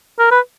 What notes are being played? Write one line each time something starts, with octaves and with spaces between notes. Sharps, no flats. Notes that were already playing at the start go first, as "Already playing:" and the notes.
A#4
B4